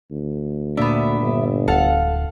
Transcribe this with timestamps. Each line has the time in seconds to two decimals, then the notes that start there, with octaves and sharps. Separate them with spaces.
0.11 D2
0.77 A#2 B3 D4 E5
1.21 G1
1.68 D1 A4 F5 F#5 A5